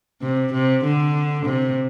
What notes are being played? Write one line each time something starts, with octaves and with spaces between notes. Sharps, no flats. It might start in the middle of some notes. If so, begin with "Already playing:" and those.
C3
C3
D3
C3